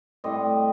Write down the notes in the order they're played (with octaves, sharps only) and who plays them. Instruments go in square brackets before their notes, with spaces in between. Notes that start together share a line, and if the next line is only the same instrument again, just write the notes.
[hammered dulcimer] A2 G3 C4 D#5